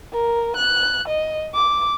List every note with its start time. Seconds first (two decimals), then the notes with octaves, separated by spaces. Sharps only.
0.13 A#4
0.56 F#6
1.08 D#5
1.55 D6